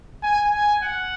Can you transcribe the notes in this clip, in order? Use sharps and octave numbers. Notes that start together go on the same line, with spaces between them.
G#5
G#5
F#5